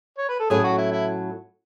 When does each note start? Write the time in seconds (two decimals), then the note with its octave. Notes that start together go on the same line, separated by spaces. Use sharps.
0.18 C#5
0.29 B4
0.39 A4
0.50 A2 F#3 A3 C#4 G#4
0.64 F#4
0.78 E4
0.92 E4